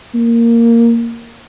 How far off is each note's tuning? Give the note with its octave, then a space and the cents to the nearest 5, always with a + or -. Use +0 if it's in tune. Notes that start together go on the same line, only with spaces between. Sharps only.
A#3 -5